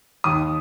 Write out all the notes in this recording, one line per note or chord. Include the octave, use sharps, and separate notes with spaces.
D#2 D#6